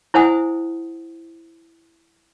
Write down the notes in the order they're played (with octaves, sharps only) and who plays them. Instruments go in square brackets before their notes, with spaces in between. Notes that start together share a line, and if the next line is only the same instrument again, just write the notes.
[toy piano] E4 C5 F#5 G#5 D#6